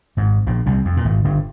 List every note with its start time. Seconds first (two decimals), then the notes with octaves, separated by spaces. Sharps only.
0.17 G#1 G#2
0.47 A#1 A#2
0.66 C2 C3
0.85 F2
0.97 A#2
1.05 G#1 G#2
1.24 G1 G2